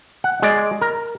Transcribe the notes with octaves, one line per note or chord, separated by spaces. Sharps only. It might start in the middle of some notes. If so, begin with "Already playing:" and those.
F#5
G#3 D5
A#4